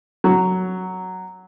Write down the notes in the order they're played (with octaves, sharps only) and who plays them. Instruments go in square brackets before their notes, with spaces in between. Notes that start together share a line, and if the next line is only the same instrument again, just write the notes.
[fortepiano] F#3